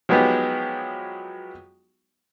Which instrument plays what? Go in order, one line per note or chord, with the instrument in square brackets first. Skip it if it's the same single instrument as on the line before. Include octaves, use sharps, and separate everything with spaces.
[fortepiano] F3 F#3 G#3 B3 D#4 G4